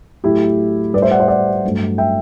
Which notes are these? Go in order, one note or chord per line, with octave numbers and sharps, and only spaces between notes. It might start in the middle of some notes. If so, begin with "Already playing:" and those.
A2 F#3 A3 E4 G4
A2 G3 B4 D5
C5 E5
D5 F#5
C5 E5
D5 F#5
G2 F#3 A3
E5 G5